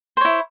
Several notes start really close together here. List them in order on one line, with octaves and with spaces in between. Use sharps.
C5 C#5 E4